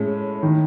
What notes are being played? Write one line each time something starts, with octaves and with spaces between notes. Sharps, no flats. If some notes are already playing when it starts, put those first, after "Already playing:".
Already playing: A2 G#3 C#4
D#3